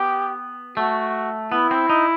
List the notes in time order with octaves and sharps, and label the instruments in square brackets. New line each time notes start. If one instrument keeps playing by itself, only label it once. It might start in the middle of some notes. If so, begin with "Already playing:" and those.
Already playing: [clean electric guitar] B3 [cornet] G4
[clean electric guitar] A3 [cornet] F#4
[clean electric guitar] B3 [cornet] E4
[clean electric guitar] C4
D#4